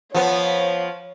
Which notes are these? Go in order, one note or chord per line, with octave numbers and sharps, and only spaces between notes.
F3 B3 C#5